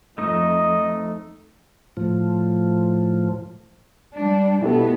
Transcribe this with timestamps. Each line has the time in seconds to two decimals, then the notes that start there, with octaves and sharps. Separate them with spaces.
0.18 F2 A3 D#4 D#5
1.97 A2 F3
4.14 G3 D4
4.62 B2 B3 E4 G4 A4